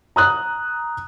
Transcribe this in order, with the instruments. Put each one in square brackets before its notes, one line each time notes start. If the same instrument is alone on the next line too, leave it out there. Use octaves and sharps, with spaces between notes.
[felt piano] A#5 D#6 F#6